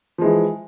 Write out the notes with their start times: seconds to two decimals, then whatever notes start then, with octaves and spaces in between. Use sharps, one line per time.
0.18 F3
0.21 G#3
0.24 E3